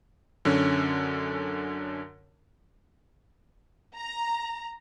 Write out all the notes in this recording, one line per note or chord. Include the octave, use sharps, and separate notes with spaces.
F#2 D3 C#4
A#5